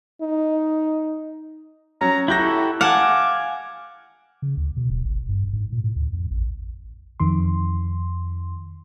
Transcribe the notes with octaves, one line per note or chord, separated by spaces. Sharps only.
D#4
F#3 C#4 A#5
E4 F#4 G4 A4 A#5 G6 A#6
F5 F#5 G#5 A5 D6
C#3
D2
B2
D1
G#1
G2
G#2
A#2
A2
D2
F2
A1
F2 D#3 C6